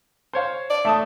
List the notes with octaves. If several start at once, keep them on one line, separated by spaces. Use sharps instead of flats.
C5 C#5 F5
D5
A3 A5 D#6